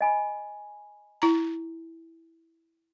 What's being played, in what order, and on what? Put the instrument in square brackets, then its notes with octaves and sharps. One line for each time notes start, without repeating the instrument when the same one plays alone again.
[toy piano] D#5 G#5 B5
[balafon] E4 A#5